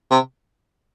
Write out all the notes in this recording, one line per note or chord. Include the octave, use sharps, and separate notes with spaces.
C3